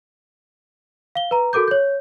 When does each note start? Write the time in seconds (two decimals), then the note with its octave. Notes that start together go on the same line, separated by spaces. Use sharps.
1.15 F5 G7
1.31 B4 A#5
1.53 F#4 A4 A#4 D6 G6
1.68 C#5 G6